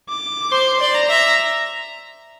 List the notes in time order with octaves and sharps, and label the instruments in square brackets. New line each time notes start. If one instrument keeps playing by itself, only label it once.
[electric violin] D6
[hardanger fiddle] C5 [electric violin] C6
[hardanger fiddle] D5
[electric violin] A#5
[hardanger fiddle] E5